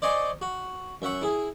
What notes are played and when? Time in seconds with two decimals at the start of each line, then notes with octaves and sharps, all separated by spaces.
0.02 C5 D5 D#5 G#5 C6 C#6
0.42 F#4
1.02 F#2 E5 F#5 C#6
1.22 E4 G#4